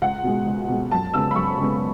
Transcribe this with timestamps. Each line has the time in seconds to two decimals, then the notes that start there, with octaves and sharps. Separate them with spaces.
0.02 C#2 F#5
0.23 B2 G#3
0.46 C#2
0.68 B2 G#3
0.91 F#2 A5
1.14 C#3 G#3 B3 E6
1.31 B5
1.35 F#2 C#6
1.58 C#3 G#3 B3